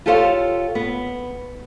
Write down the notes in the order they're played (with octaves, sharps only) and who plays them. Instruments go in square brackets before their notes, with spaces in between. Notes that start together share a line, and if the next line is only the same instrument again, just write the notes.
[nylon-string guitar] F4 G4 A4 C5 C#5 F5
B3